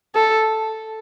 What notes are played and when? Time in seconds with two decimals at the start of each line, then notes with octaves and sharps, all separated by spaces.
0.15 A4